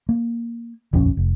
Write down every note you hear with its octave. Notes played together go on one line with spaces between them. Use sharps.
A#3
D#1 A#1 F2 C#4
F1